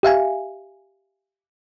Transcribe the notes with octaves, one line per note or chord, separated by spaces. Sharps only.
G4 E5 F5 G#5